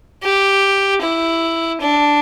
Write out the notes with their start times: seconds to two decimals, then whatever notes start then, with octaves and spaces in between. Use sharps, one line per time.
0.23 G4
1.01 E4
1.81 D4